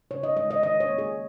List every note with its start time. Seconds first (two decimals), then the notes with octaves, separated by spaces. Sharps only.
0.11 C#3 C#5
0.23 D#5
0.36 G#3 D#5
0.51 D#5
0.63 D#3 D#5
0.80 C#5
0.89 A#3
0.98 G#4